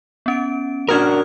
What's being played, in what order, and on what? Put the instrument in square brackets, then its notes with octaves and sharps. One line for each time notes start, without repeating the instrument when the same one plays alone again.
[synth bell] B3 C#4 D7
[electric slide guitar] D4 F#4 A#4 [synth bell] D#6 F6 G#6